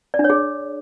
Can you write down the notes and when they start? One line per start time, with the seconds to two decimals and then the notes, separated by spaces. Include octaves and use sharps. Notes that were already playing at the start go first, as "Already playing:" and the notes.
0.14 D5
0.19 D4
0.24 C#5
0.30 G#4